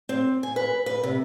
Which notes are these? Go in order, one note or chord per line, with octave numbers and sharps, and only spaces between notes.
C4
G#5
B4
B4
C3